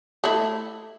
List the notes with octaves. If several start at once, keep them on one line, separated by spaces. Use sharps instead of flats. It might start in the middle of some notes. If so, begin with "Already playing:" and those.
A3 E4